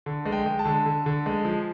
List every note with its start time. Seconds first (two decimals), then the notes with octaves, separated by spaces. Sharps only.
0.06 D3
0.26 G#3
0.32 G5
0.46 G#3
0.59 A5
0.65 D3
0.86 D3
1.06 D3
1.26 G#3
1.45 F3